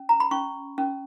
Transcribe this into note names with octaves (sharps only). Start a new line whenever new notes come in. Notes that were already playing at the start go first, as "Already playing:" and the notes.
Already playing: C#4
A#5
B5
C#4 C#6
C#4